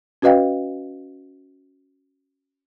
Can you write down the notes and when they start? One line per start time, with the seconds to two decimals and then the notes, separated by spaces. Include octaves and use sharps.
0.22 C#4 F#4 B4 D#5 F5 G5